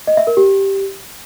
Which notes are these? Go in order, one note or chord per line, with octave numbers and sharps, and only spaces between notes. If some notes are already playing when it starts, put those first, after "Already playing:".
D#5
E5
A#4
G4